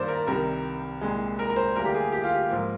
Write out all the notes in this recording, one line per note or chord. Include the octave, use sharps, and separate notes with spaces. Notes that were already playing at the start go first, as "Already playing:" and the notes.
Already playing: G2 D#3 A#3 C5 D5
A#4
C2 C3 D#3 G3 A#4
C2 A#2 G#3
A#4
A#4
C5
D2 D3 G3 A#3 A#4
G4
G#4
G4
F4
G4
G#2 F3 A#3